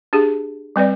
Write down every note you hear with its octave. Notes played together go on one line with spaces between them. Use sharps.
D4 G4 G#4
G3 C4 B4 D5